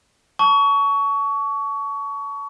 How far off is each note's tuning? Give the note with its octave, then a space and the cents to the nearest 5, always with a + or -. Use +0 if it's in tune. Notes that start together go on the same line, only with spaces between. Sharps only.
A5 +0 C#6 +25